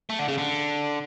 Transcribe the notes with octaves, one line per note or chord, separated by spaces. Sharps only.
A3
D3
C#3
D3